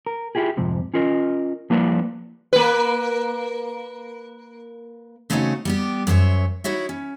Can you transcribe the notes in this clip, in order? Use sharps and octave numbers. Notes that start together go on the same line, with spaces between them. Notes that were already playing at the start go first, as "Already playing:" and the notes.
A#4
E4 F4 G4 G#4
F2 G#2 C3
C#4 F4 A#4 D#5
F3 G3 A#3 E4 B4 D5
A#3 B4
C#3 A3 C4 C#4 D#4 F#4
G3 B3 G4
F#2 C5 C#5 E5
D#4 E4 F#4 C#5 E5
C#4